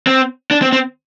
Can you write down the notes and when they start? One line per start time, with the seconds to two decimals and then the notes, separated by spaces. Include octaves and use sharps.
0.07 C4
0.51 D4
0.62 C4
0.72 C4